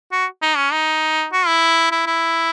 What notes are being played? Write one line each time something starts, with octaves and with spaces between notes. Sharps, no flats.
F#4
D#4
C#4
D#4
F#4
E4
E4
E4